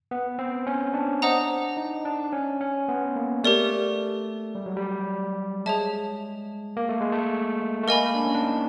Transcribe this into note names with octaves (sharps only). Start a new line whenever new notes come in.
B3
C4
C#4
D4
C5 D#5 F#5 A#5 D#6
D#4
D4
C#4
C#4
B3
A#3
A3 G4 A#4 D5
G3
F#3
G3
G#3 G#4 C#5 E5 A5
A#3
A3
G#3
A3
A3
A#3 A#4 D#5 G#5 B5
D4
C#4
D4
D#4